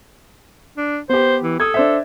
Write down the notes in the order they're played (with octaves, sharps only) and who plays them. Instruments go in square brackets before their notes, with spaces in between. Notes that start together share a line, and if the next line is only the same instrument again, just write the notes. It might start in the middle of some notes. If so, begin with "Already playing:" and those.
[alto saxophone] D4
[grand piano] B3 G4 [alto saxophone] C5
[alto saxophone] E3
[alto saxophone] A4 [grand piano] D#6 G#6
[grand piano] D4 C5 E5